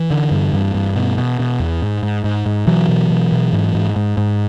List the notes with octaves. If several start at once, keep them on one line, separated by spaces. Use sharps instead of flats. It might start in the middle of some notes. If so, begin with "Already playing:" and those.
Already playing: E3
D3
G2
G2
G2
B2
B2
B2
E2
G#2
G#2
G#2
G#2
B2 E3 F#3
B2
B2
B2
G#2
G#2
G#2
G#2